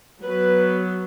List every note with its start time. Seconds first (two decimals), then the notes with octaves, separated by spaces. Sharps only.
0.22 F#3 B3 B4